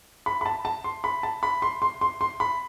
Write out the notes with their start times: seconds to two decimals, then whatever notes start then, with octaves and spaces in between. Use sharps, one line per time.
0.26 B5
0.41 B5
0.46 A5
0.65 A5
0.84 C6
1.04 B5
1.23 A5
1.43 B5
1.62 C6
1.82 C6
2.01 C6
2.21 C6
2.40 B5